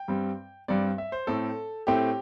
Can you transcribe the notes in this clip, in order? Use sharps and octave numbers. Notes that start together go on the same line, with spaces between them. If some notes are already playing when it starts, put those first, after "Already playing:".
Already playing: G5
G2 G3 C4
G2 G3 C4 D5
E5
C5
A2 A3 C4 A4
A2 A3 C4 G4